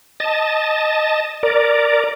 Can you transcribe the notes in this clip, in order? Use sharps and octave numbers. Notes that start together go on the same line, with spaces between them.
D#5 A5
A#4 D5